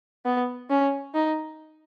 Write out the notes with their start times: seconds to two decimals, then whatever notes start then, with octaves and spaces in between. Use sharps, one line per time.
0.25 B3
0.70 C#4
1.14 D#4